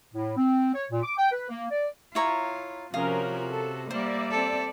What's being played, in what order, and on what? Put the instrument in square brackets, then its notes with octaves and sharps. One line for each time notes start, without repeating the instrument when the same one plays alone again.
[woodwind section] A2
C4
C#5
A#2
D6
G5
B4
A#3
D5
[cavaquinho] E4 C#5 A#5 [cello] F4
[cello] C3 F#4 [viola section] F3 C#4 A#4 [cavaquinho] F5 D#6
[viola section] A4
[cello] G3 A#3 [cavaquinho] C5 [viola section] D5 E5
[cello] C4 A4